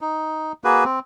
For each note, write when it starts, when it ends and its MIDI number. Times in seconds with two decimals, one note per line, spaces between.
0.01 0.52 63
0.64 0.84 58
0.64 0.84 66
0.64 0.84 68
0.64 0.84 71
0.84 0.99 60